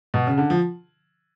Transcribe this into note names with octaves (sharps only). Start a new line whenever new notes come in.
B2
C#3
D3
F3